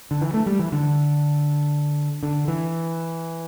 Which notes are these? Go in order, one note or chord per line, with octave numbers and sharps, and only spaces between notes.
D3
E3
A3
G3
E3
D3
D3
E3